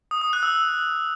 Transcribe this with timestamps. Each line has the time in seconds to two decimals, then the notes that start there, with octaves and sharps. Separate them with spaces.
0.11 D#6
0.22 D#6
0.33 F#6
0.43 E6